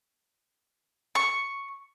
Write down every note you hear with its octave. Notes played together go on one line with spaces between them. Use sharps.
C#6